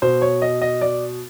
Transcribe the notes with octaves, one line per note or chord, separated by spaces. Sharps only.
B2 C5
C#5
D#5
D#5
D5